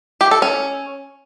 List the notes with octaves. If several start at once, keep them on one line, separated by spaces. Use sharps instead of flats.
G4
A4
C#4